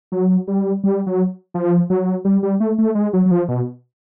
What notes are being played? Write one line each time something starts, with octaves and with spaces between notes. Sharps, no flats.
F#3
G3
G3
F#3
F3
F#3
G3
G3
A3
A3
G#3
F#3
F#3
F3
B2